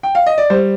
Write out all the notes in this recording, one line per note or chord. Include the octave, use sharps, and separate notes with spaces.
G5
F5
D#5
D5
G3 C5